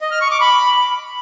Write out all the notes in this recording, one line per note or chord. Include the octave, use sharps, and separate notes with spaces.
D#5
F6
C#6
D6
B5